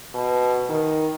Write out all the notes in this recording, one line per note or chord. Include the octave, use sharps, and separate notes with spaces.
B2
D#3